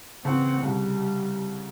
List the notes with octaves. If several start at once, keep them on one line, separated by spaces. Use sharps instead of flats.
C#3 E3 C4 F#5
C2 C#3 G3